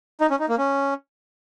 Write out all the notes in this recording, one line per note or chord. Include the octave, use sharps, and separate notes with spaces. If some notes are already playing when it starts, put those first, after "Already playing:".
D#4
C#4
D#4
A#3
C#4